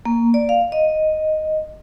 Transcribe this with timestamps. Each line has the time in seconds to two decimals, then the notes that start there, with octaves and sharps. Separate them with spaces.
0.05 A#3
0.34 D5
0.49 F5
0.72 D#5